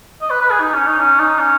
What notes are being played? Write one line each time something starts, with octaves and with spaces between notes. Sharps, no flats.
D#5
B4
B4
G#4
D#4
C#4
D#4
C#4
D#4
C#4